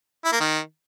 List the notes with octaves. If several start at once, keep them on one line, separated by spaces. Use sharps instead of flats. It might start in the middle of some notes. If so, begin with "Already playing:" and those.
E4
A#3
D#3